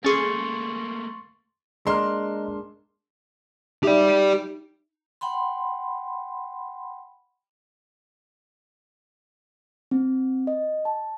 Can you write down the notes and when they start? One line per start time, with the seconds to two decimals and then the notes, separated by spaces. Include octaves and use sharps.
0.04 A3 A#3 C#4 G#4 C6 C#6 A6
1.87 G#3 A#3 D4 D#5 A#5 C6 F6
3.83 D#4 G4 D5 E5
5.21 F#5 G5 B5 C6
9.91 C4
10.47 D#5
10.85 A5